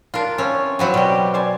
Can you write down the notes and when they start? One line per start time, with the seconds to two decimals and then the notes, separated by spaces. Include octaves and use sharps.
0.14 D4 F4 A#4 F5
0.38 E3 C4 C#4 C#5
0.79 F#3 B3 C4 E4 F4
0.94 B2 G3 G4
1.34 C5 D5 G#5